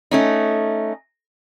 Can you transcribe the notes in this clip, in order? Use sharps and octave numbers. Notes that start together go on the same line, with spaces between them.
A3 C#4 D#4